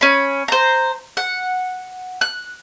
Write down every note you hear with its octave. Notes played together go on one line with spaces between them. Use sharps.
C#4 B5
C5 A#5
F#5
F#6